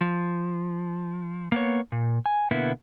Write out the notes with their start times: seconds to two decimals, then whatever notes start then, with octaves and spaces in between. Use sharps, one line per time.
0.01 F3
1.52 A#3 B3 C#5
1.92 A#2
2.26 G#5
2.51 B2 D3 A#3 B3 E4